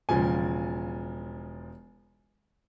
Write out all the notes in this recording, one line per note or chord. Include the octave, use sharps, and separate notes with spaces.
E1 C#3 F3 G#5